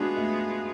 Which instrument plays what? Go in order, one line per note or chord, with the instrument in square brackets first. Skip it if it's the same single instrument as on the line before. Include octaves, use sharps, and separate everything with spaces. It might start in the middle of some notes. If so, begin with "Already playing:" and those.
Already playing: [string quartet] G#3 B3 F4 G#4 [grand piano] D4 F#4
[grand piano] A3